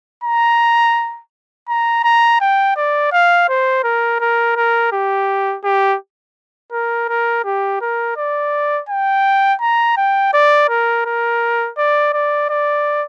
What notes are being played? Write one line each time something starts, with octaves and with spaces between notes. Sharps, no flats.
A#5
A#5
A#5
G5
D5
F5
C5
A#4
A#4
A#4
G4
G4
A#4
A#4
G4
A#4
D5
G5
A#5
G5
D5
A#4
A#4
D5
D5
D5